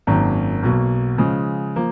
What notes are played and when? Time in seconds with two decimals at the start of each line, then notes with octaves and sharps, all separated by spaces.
0.07 G#1 F#2 D#3 A#3
0.63 B1 B2 A#3
1.18 C#3 F3 G#3
1.76 F3 A#3